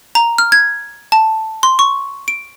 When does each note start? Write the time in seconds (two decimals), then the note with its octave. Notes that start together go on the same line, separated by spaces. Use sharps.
0.15 A#5
0.38 F6
0.52 G#6
1.12 A5
1.63 C6
1.79 C#6
2.28 D7